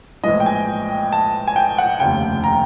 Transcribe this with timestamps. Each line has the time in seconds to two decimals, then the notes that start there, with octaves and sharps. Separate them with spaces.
0.24 A#1 A2 E3 G#3 D#5
0.40 G5
0.46 G#5
1.13 A5
1.47 G#5
1.56 G5
1.78 F#5
2.00 F1 D#2 C#3 G5
2.44 A#5